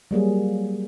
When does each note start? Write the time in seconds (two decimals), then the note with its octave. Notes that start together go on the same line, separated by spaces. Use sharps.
0.11 F#3 G3 A#3 G#4